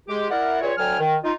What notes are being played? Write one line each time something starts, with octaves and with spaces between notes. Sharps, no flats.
G#3 G4
E4 A#4 D5 F#5
C#2 A#2 C#5
D2 D3 F#3 G5 G#5 F6
D#3
D#4 F4